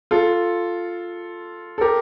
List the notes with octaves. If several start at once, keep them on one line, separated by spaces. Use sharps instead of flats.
F4 A4
A4
G4 A#4